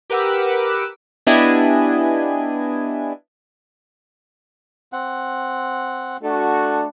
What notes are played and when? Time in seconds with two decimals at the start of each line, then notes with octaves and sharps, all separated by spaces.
0.10 G4 A#4 B4 F#5 D6 E6
1.27 B3 D4 E4 G4 D#5 G#5
4.93 C4 F#5
6.23 A3 D4 F#4